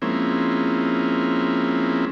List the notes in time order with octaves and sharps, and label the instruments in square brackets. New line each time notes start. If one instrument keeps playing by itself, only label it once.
[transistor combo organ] F3 G#3 A#3 C4 C#4 E4